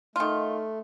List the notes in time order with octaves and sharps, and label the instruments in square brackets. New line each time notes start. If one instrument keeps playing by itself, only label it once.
[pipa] D#3 F4 [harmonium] A3